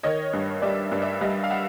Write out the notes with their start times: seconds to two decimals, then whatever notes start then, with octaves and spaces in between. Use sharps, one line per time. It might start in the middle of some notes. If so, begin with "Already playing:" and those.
0.03 D#3 C#5 D#5
0.33 G2
0.62 G3 D5 E5
0.92 G2
1.02 D5 E5
1.21 G3 D#5 F5
1.44 F5
1.50 E5 F#5